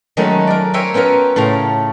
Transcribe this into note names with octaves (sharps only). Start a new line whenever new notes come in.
D#3 F#3 G#3 A3 C#4 D#4
A#4 D5
A#4 C5 C#5 E5 G5 G#5
B3 C#4 F4 A#4 B4
A2 C#3 A3 A#5 C6